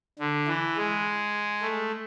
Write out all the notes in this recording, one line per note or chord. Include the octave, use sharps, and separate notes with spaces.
D3
E3
G#3
A3